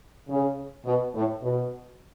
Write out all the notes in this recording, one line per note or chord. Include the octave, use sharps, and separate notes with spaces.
C#3
B2
A2
B2